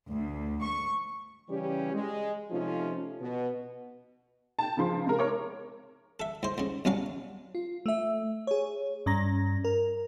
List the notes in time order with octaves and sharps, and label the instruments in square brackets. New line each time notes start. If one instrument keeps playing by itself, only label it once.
[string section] D2
C#6
[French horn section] C#3 E3 G3 C#4 G4
G#3
C3 F3 A3 C#4 D#4 F4
B2
[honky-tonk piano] G5 A5
C#2 C#3 F3 C6
C3 G#3 A#4
A#4 C#5 D6
[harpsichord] A4 E5
G#2 C5
G#2 C#3
B1 B2 C#4 D4 F5 A#5
[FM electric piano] F4
A3 E5
G#4 C#5
G2 C#4 A#5 A#6
A#4